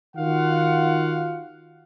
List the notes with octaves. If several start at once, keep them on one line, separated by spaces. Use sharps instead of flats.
D#3 F4 F#4 F5 F#5